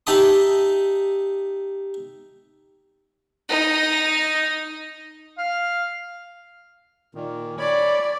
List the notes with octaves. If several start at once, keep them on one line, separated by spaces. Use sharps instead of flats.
D#4 G4 E5 A5 B5 D#6
D#4
F5
A#2 D#3
C#5 D5 B5